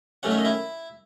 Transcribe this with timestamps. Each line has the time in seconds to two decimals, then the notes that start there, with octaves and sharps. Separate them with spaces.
0.23 F#2 D#3 F#3 A3 C#4 F#5
0.31 E5
0.38 D#5
0.45 E4 E5